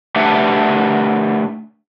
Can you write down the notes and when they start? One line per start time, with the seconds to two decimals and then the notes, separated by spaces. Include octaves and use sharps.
0.16 A3 D4 G4 B4 E5 F#5